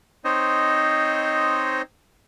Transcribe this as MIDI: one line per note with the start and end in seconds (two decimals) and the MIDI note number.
0.25 1.82 60
0.25 1.82 63
0.25 1.82 72
0.25 1.82 73
0.25 1.82 75